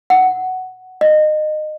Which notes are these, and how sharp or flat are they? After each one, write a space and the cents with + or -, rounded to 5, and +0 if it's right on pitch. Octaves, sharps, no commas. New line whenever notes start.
F#5 +5
D#5 -25